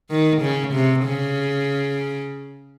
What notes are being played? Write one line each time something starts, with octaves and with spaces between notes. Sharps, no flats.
D#3
C#3
C3
C#3